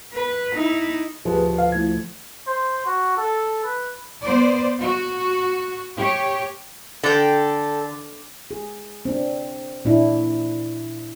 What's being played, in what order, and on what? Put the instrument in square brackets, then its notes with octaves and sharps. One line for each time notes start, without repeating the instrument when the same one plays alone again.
[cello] B4
D#4 E4
[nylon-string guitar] D2 F3 [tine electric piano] G4 G#4 B4
[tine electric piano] B4 F5
A3 E4 G#6
[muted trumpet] C5
F#4
A4
B4
[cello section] B3 C5 D5
F#4
G4 C#5
[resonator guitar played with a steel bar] D3 [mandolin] A4 G5
[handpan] G#4
C4 D4
A#2 D4 E4